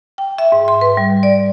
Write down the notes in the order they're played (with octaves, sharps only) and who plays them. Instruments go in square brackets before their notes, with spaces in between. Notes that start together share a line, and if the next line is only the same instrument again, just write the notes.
[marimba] G5
E5
G#2
C6
B4
G3
D5